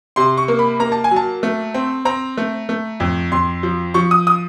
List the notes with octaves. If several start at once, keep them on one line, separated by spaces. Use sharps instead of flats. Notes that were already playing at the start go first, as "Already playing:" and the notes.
C3 C6
C#6
A#3
B5
A#3 A#5
A5
G#5
F#3
A5
A3
C4
C4 A#5
A3
A3
F2
F2 C6
F3
F3 C#6
D#6
D#6